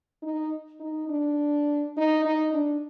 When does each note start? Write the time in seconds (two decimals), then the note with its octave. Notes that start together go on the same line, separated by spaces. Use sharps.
0.23 D#4
0.80 D#4
1.09 D4
1.97 D#4
2.25 D#4
2.54 D4